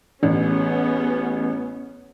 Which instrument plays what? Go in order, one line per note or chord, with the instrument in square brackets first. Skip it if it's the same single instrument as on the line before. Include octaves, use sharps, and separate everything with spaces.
[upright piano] A1 [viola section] B3 C#4 G#4